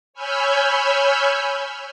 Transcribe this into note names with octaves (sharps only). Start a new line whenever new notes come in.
C#5 G#5 B5 E6 F6 G6